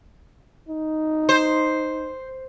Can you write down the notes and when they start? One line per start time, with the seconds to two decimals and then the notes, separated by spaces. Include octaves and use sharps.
0.69 D#4
1.29 C5